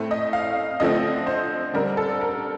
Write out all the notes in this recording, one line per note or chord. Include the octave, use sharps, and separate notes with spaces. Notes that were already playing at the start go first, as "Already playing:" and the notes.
Already playing: A2 A3 C4
D#5
F5
D3 F3 A3 C4 D#5
C5
D3 G3 C4 A#4
A4
A#4